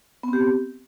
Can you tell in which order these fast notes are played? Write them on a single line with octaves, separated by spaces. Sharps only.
B3 C4 G4